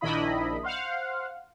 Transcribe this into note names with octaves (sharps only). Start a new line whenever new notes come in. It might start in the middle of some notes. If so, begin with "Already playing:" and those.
A#1 D#3 D4 E4 D#5 B5
C5 F5 F#5